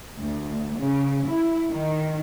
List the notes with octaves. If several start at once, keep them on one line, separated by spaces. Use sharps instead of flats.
D2
C#3
E4
D#3